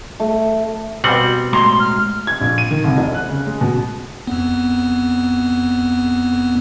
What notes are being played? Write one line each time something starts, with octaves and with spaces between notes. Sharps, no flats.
A3
B2 G3 C4 F#5
A2 G#3 A#5 C6
F6
G#6
A#1
D#7
D#3
C2
E1
F#6
C#3
G#3
B2
F2 B3